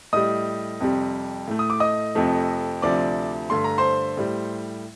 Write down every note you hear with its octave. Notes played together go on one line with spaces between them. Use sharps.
A2 G3 D#5 D#6
F2 C3 G3
A2 A3
D#6
D6
D#5 D#6
F2 C3 F3 A3
D2 C3 F3 D5 D6
G2 D3 A3 C6
A#5
C5 C6
A2 G3